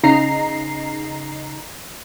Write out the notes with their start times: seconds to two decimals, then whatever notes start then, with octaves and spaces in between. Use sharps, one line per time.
0.03 C#3 D#4 A#5 C7